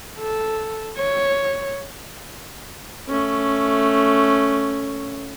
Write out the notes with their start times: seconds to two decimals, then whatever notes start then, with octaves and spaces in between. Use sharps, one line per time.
0.18 A4
0.98 C#5
3.09 A3 C#4